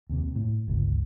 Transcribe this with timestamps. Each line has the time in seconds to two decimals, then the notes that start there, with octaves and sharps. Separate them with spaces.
0.09 D#2 C3
0.35 A2
0.68 G1 C#2